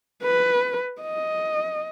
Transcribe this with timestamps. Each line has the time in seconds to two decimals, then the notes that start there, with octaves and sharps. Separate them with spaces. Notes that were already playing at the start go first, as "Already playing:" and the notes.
0.23 B4
1.01 D#5